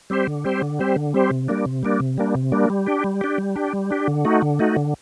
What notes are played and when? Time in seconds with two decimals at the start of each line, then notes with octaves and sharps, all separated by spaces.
0.10 G3 C4 G4 C5
0.27 D3
0.44 G3 C4 G4 C5
0.62 D3
0.79 G3 C4 G4 C5
0.96 D3
1.14 G3 C4 G4 C5
1.31 C3
1.48 G3 A#3 D4
1.65 C3
1.83 G3 A#3 D4
2.00 C3
2.18 G3 A#3 D4
2.35 C3
2.52 G3 A#3 D4
2.70 G3
2.87 D4 G4
3.04 G3
3.21 D4 G4
3.38 G3
3.56 D4 G4
3.73 G3
3.90 D4 G4
4.08 D3
4.25 A3 D#4 F#4
4.42 D3
4.59 A3 D#4 F#4
4.77 D3